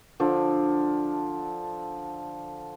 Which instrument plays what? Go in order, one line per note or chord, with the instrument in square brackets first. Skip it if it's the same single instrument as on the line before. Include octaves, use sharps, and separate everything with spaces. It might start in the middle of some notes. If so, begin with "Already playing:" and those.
[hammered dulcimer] D3 F3